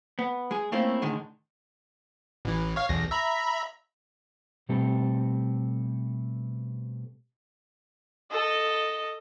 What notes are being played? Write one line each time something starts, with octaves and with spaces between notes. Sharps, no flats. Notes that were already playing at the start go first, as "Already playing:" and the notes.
B3
G#3 G#4
A3 A#3 C4 C#4 E4 F4
A2 D3 D#3 G#3
A1 E3
C#5 F5
B1 E2 A#6
E5 A#5 B5
B2 G3 A3 C4 G4 A4
A4 D#5